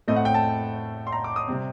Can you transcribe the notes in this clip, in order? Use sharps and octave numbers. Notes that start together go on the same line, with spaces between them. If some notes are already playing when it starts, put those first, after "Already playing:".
A2 A3 C4 D#5
F#5
G5
A5
C6
A#5
D6
D#6
C3 G3 C4